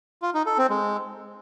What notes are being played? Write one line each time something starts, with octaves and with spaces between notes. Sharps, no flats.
F4
D#4
A4
C4
G#3